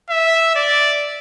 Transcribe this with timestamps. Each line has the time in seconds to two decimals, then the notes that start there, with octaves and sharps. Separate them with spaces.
0.10 E5
0.56 D5